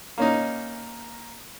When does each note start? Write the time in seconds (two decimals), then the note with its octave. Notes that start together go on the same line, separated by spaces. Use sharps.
0.18 A#3 C#4 D#4